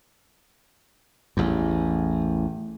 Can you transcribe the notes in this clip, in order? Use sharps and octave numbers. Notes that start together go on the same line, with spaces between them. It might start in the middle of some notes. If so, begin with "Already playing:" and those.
A1 E2